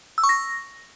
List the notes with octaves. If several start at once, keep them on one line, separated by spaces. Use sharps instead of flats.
E6
C#6
A#6